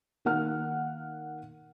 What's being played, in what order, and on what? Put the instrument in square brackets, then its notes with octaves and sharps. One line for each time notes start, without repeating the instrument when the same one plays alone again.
[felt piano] D#3 A#3 F#5 F6